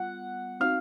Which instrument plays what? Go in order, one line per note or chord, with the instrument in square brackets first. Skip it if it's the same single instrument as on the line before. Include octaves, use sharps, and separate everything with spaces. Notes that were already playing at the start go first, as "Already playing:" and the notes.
Already playing: [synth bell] G3 B3 F4 [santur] F#5
[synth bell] C4 D#4 F#4 [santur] F5